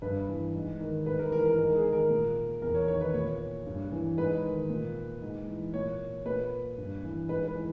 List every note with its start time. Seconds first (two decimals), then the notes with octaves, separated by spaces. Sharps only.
0.02 G2 B4
0.29 E3
0.54 G#2
0.80 D#3
1.06 G#2 B4
1.19 A#4
1.32 E3 A#4
1.45 A#4
1.58 G#2 A#4
1.75 G#4
1.84 D#3
1.93 A#4
2.10 A#2
2.62 E2 A#4
2.75 C#5
2.88 D#3 C#5
3.01 B4
3.14 A#2 C#5
3.66 G2
3.92 E3
4.18 G#2 B4
4.44 D#3
4.69 A#2
5.22 G#2
5.48 E3
5.74 A#2 C#5
6.26 A#2 B4
6.77 G2
7.04 E3
7.29 G#2 B4
7.47 B4
7.55 E3